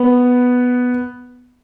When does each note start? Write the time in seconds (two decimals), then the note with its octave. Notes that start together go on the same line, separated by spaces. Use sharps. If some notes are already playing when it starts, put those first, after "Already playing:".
Already playing: B3